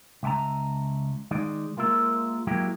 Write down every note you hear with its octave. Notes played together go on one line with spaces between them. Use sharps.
C#2 E5 G5 A5 A#5
D#3 G#3 D#4 D5
G#3 A#3 F4 A#4 E5
F#3 G#3 A#3 E4 G4